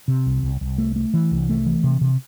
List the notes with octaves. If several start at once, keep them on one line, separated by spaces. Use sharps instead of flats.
C3
C2
C2
C2
A3
A3
E3
C2
A3
E3
C3
C3